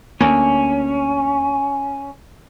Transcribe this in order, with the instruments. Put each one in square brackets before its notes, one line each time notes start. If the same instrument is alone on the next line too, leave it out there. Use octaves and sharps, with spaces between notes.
[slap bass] D2 A#3 [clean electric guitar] C#4